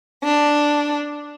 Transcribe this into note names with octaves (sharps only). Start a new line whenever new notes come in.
D4